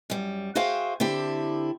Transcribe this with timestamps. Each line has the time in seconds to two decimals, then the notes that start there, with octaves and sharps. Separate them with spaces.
0.10 F#2 G3
0.55 F#4 G#4 C5 E5 F5 G5
1.00 D3 C4 E4 G4 A4